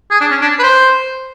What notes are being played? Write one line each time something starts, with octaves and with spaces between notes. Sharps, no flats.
G#4
D4
C#4
D4
B4
C5